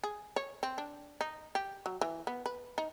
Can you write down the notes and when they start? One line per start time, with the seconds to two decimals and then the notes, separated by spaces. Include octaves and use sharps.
0.04 G#4
0.36 C#5
0.63 C4
0.78 D4
1.21 D#4
1.55 G4
1.86 F#3
2.01 E3
2.27 B3
2.46 B4
2.78 D#4